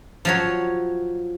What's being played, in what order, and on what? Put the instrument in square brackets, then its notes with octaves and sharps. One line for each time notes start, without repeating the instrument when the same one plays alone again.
[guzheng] F3 F#3 C#5